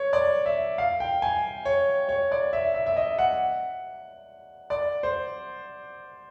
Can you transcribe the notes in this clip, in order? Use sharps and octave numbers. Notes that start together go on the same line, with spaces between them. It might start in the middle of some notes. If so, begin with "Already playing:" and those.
Already playing: C#5
D5
E5
F5
G5
G#5
C#5
C#5
D5
E5
E5
E5
D#5
F#5
D5
C5